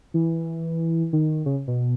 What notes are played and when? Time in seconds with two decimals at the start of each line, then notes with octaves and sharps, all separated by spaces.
0.14 E3
1.13 D#3
1.46 C#3
1.67 B2